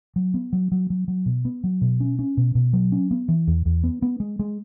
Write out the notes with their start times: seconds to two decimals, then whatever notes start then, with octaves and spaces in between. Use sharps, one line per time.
0.16 F#3
0.34 B3
0.53 F#3
0.72 F#3
0.90 F#3
1.08 F#3
1.26 B2
1.45 B3
1.64 F#3
1.81 B2
2.00 C#4
2.19 C#4
2.37 B2
2.55 B2
2.73 F#3
2.92 C#4
3.11 B3
3.29 E3
3.47 E2
3.66 E2
3.83 B3
4.02 B3
4.20 G#3
4.39 G#3